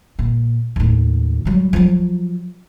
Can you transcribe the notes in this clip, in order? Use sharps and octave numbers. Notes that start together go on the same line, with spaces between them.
A#2
D#2 A2
F#3 G3
F3 F#3